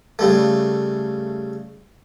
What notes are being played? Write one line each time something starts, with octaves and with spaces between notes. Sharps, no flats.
C#3 G3 A3